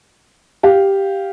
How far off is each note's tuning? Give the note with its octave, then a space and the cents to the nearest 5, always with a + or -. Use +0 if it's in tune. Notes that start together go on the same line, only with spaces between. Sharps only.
G4 +0 F5 +0